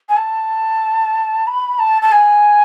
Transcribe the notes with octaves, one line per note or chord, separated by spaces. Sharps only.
G#5
A5
B5
A5
A5
G#5